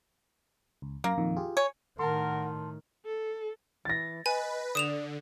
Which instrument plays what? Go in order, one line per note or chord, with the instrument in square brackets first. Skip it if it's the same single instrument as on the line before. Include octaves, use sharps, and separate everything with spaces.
[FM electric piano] C#2
[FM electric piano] F#2 F5 A#6 [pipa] A#3
[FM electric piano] F2 A#2 D#3
F4 G4 G#4
[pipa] C#5 [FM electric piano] G#5
[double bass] A2 D#3 [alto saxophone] A#4 [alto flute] F#5 [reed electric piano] A5 C6
[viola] A4
[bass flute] E3 [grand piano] A6 A#6
[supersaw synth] B4 [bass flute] D#5 [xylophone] G#5
[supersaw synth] D3 [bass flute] D5 [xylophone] D#6 E7 F7